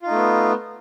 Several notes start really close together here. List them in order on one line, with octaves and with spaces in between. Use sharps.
F4 D#4 A3 B3